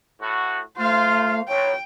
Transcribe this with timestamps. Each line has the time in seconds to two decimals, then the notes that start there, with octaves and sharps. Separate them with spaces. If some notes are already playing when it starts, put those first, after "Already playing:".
0.21 A2 F#4
0.78 A3 F4 C5 F5
1.48 B1 C#5 G5